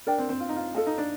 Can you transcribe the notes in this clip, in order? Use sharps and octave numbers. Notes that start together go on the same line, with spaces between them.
D4 A#4 D5 G5
C4
C4
F4
D#4
F4
F4 A4 D#5 A5
D#4
D4